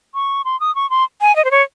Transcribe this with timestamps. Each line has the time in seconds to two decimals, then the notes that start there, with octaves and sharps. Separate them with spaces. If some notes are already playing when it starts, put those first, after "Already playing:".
0.14 C#6
0.45 C6
0.60 D#6
0.75 C#6
0.90 C6
1.21 G#5
1.36 D#5
1.45 C5
1.51 C#5